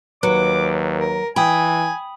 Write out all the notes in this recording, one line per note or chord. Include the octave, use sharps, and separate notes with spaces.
D#2 F#3 B4 D6
A#4
E3 G5 G#5 B5 D#6